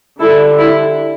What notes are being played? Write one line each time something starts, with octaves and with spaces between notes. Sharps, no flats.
D3 G3 D4 E4 A4
E4